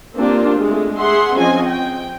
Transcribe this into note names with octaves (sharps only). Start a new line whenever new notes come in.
A#3 C4 D4 F4 G4
G#3 A3
G#4 E5 F#5 C6
F3 C4 C#4 D#5 G#5
G5